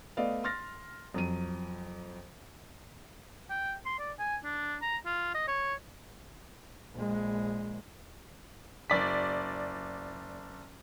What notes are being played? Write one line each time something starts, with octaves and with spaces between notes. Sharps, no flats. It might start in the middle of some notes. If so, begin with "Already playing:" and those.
A3 B3 D5 D#5 F5
C6 F6 A6 A#6
F2 F#3 D#7
G5
C6
D5
G#5
D4
A#5
F4
D#5
C#5
A#1 G#3
F#1 D5 B6